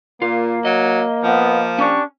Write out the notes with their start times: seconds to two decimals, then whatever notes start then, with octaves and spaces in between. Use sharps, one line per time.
0.22 A#2 A#3 F4
0.65 F#3 D#5
1.23 F3 B3
1.78 C#4 D4 G4 C#6